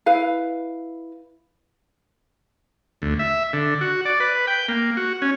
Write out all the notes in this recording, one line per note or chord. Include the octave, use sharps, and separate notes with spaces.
E4 B4 F5
D2
E5
D3
F#4
D5
B4
G5
A#3
F#4
C#4